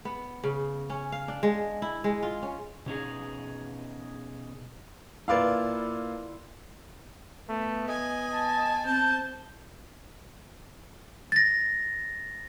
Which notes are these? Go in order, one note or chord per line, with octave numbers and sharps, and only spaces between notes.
B3
C#3
C#4
F5
D4
G#3
E4
G#3
F4
C#4
B2 C#4 D#4 G#4
A#2 E4 F4 B4 D5 F5
A3 B3
D#5 G#5
A5
C4 A5 G6
A6 A#6